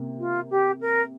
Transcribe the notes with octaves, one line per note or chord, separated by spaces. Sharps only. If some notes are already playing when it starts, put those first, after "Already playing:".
Already playing: C3 A#3
F4
G4
A#4